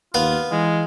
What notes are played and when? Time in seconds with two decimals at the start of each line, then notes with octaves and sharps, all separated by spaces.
0.14 D#2 B3 F4 F5
0.51 E3 G#3